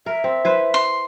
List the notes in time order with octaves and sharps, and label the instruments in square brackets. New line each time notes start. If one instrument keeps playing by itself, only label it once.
[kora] A#4 [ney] E5
[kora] C4
E4 B4 C5
[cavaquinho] C6